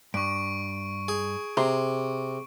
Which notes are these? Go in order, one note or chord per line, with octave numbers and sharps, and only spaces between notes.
G2 C#6 D7
G#4
C3 G#4 A#5 C6